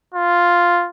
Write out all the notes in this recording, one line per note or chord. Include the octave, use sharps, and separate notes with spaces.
F4